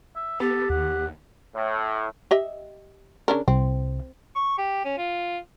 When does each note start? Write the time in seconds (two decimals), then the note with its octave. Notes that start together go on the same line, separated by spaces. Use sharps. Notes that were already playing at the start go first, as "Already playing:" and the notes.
0.15 E5
0.40 B3 G4 A4
0.70 D#2 F#5
1.55 A2
2.31 G4 D#5 E5
3.28 C#3 D4 A#4
3.48 C2 C4
4.35 C#6
4.58 G4
4.85 C#4
4.97 F4